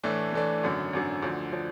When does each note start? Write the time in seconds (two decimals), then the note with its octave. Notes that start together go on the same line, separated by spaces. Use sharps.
0.04 A2 E3 A3 D4
0.33 A2 E3 A3 D4
0.63 G#1 F#2 D3
0.93 G#1 F#2 D3
1.23 D2 D3 F3
1.52 D3 F3